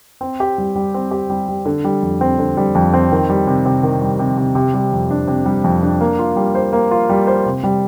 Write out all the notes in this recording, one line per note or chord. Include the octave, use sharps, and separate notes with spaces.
C4
G4
G3
G3
C4
G4
G3
G3
D3
G3
F2
C4
D3
G3
F2
C4
D#3
G3
C3
C3
D#3
G3
C3
C3
C3
G3
F2
D4
C3
G3
F2
D4
A#3
F4
G3
C5
A#3
F4
G3
C5
C3
G3